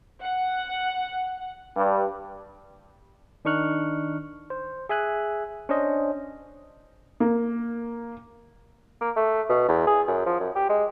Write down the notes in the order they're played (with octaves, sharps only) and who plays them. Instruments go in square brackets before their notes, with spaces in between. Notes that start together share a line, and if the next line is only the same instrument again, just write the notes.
[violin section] F#5
[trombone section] G2
[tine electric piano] D#3 D4 D#4 C#6 F6 F#6
C5
G#4 E5 G#5 F#6
C#4 D4 C5 D#5
[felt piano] A#3
[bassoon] A#3
A3
B2
E2
G#4
F#2
F3
F#2
G4
G#3